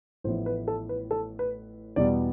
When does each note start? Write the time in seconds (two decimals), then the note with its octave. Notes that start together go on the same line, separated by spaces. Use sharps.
0.24 A1 A2 F3 B3 E4 C5
0.46 B4
0.68 A4
0.89 B4
1.11 A4
1.39 B4
1.96 E2 B2 G3 B3 D5